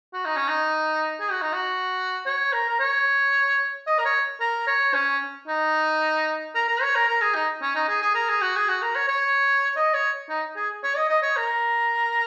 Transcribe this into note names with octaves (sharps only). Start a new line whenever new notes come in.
F#4
D#4
C#4
D#4
G#4
F#4
D#4
F#4
C#5
A#4
A#4
C#5
D#5
A#4
C#5
A#4
C#5
C#4
D#4
A#4
A#4
C#5
A#4
A#4
G#4
D#4
C#4
D#4
G#4
G#4
A#4
G#4
F#4
G#4
F#4
A#4
C#5
C#5
D#5
C#5
D#4
G#4
C#5
D#5
D#5
C#5
A#4